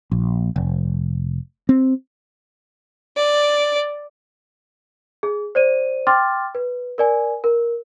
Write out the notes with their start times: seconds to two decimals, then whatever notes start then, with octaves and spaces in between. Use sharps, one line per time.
0.11 A#1
0.56 F1
1.69 C4
3.17 D5
5.23 G#4
5.55 C5 D5 D#7
6.07 G5 C6 D6 F6 A6
6.55 B4
6.98 A#4 D5 G#5
7.44 A#4